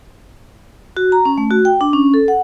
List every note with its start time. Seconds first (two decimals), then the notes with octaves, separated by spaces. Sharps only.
0.97 F#4
1.12 A#5
1.25 C#4
1.38 A3
1.51 F#4
1.65 G5
1.81 D4
1.93 C#4
2.14 A4
2.28 F#5